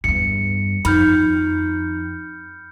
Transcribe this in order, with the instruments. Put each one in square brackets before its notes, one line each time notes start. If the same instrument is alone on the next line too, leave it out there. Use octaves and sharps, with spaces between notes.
[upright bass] E2 G2 [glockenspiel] C#7
[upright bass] F2 [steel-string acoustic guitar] D#3 [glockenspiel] B5 F6 G6